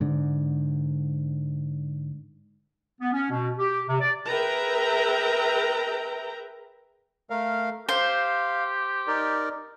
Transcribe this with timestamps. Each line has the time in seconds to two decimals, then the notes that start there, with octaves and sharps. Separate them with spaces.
0.01 G#2 D3
3.01 B3
3.13 C#4
3.30 B2
3.59 G4
3.89 C3
4.01 D5
4.29 G#4 A#4 B4 E5 G5 A#5
7.30 A3 A#4 F5
7.89 G4 C5 F5
9.07 D#4 A#4 D5